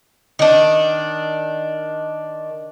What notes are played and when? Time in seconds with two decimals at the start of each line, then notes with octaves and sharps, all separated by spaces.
0.39 D#3 D4